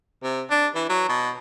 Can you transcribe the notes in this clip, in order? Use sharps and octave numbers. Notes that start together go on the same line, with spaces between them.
C3
D4
E3
F#3
B2